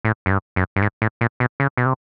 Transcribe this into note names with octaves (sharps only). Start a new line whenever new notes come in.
A2
F#2
G2
F#2
G2
G#2
A2
A#2
B2
C#3
B2
C3